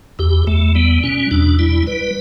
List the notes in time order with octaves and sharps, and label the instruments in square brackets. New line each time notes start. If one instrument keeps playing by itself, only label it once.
[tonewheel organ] E2 G4
E2 A3
G3 B3
B2 C#4
E2 D4
G3 E4
G3 B4